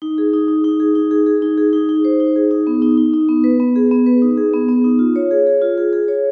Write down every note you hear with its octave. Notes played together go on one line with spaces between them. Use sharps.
D#4
G#4
D#4
D#4
D#4
G#4
D#4
G#4
G#4
D#4
G#4
D#4
D#4
C5
D#4
G#4
D#4
B3
D#4
D#4
D#4
B3
B4
B3
G#4
B3
B4
D#4
G#4
B3
B3
D#4
F4
C#5
G#4
G#4
F4
G#4
G#4
C#5